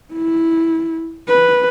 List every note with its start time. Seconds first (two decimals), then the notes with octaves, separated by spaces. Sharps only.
0.13 E4
1.29 B4